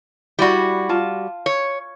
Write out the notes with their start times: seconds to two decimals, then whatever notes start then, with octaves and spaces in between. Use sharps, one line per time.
0.39 G3 E4 F#4 D5 B5
0.89 F4 A5
1.46 C#5